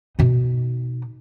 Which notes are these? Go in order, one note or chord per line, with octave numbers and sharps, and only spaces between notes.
B2 D#4